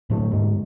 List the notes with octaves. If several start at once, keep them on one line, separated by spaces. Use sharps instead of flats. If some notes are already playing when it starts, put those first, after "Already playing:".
D2 A2 D3 A3
G#2 G#3